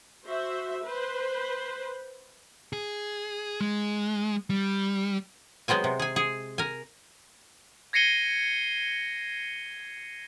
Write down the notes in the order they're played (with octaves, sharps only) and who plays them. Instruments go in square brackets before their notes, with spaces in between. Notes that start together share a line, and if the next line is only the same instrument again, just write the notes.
[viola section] F#4 C5 E5
B4 C5
[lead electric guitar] G#4
G#3
G3
[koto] F#3 G#3 B3 C4 G#5
C3
G#4 G#5
G#4
A#4 G#5
[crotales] G#6 A#6 C7 C#7 D#7 G7